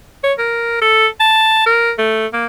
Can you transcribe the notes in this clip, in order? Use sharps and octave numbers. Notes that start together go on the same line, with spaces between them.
C#5
A#4
A4
A5
A#4
A3
A#3